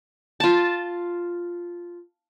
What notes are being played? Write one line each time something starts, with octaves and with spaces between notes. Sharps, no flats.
F4 A5